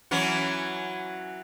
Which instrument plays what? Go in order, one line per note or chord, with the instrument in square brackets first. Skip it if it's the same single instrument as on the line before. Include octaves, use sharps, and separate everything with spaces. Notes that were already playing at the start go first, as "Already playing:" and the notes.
[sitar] E3 F#3 C#4